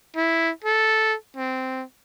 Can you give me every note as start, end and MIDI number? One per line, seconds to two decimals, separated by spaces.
0.16 0.51 64
0.64 1.15 69
1.37 1.84 60